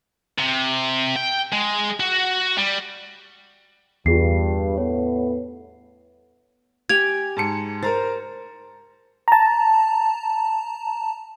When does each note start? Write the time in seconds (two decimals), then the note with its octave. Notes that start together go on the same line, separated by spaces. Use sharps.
0.38 C3
1.16 G5
1.53 G#3
2.00 F#4
2.58 G3
4.06 E2 G2 F4 G#4 C7
4.77 A2 B3 C#5
6.89 G4 G5 G#5 G#6 F7
7.37 G#2 A5 C#7
7.83 A#4 C5 A#5 A6
9.28 A5 A#5